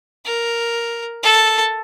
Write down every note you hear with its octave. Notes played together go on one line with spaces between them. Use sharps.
A#4
A4